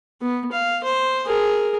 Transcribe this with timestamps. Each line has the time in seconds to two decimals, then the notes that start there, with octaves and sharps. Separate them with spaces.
0.21 B3
0.52 F5
0.84 C5
1.25 G#4 A#4